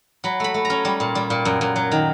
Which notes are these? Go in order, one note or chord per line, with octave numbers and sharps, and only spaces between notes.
F#3 B5
A3 B5
A3
C#4 A#5
G3
A#2
G3
A#2
F#2
F#2
F#3
D#3